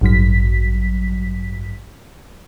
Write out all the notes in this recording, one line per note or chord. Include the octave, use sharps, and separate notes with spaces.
A1 G2 F#3 B6